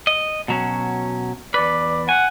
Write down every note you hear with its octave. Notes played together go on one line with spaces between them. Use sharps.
D#5
B2 F#3 C#4
E2 B4 D5
F#5 G#5